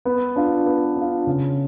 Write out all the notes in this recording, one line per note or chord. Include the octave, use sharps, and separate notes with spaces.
B3
D4 F4
B3
D4 F4
C#3